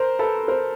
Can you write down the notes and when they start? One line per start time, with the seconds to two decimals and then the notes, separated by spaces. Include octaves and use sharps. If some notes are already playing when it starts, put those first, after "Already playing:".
Already playing: A#4 C5
0.19 A4 B4
0.48 A#4 C5